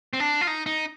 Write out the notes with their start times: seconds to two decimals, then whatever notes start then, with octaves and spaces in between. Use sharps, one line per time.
0.13 C4
0.20 D4
0.41 F4
0.47 D#4
0.66 D#4